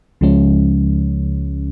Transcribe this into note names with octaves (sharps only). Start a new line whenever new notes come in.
C#2 C#3 F3 G#3 C#4